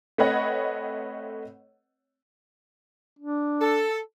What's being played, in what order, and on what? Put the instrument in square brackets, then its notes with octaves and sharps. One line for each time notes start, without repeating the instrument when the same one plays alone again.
[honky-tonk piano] A3 C4 B4 C#5 D#5 F#5
[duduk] D4
[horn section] A4